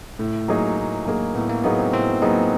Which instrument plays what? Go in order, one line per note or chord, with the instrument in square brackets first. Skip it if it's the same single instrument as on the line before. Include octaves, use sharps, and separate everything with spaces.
[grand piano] A2 [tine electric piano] A3
[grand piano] F#3 A#3 D#4 G#4
A2
F#3 A#3 D#4 G#4
[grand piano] A2 [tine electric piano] B3
[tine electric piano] A#3
[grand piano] F#3 A#3 D#4 G#4 [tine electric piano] B3
[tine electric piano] C4
[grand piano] A2 [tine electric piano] C4
[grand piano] F#3 A#3 D#4 G#4 [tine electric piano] B3